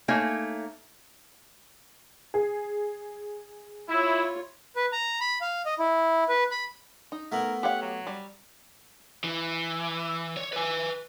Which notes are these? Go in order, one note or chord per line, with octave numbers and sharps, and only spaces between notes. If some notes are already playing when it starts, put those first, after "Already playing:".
A3 A#3 D#4 C#5 G#5
G#4
E4 F4 C#5
B4
A#5
B5
F5
D#5
E4
B4
B5
D#4
A3 B3 E4 A#4
G4 C#5 F5 F#5
F#3
G3
E3
C#5
B4 G#5